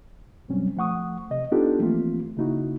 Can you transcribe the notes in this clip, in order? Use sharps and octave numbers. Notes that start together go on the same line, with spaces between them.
G2 B2 F#3 G3 C4 C#4
F3 A3 F#5 C#6 D#6
C3 D#5
B3 D4 D#4 F4 G4 A4
E3 F3 A3 A#3 C4 F4
C#3 A#3 D#4 E4 F#4